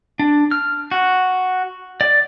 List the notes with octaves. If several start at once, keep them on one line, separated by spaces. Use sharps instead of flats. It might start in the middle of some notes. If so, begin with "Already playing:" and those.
D4
F6
F#4
D5